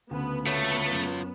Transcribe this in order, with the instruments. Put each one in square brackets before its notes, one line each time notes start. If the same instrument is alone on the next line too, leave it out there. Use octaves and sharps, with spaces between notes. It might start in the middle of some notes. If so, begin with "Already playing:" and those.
[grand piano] D2 C#3 [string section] B3
[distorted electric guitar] A3 [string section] B3 [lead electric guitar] F4 C#5
[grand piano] F#2